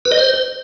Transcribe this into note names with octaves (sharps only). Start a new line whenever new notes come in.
B4
D#5
C5